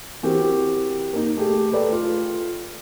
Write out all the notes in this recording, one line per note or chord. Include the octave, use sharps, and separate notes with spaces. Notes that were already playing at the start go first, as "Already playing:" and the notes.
E3 C4 F#4 G4 A#4
A#3 D#4
A3 G4 G#4
A3 A4 B4 D5 G5
F4